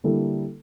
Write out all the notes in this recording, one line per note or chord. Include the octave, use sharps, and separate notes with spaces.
D3 G3 A#3 E4 A4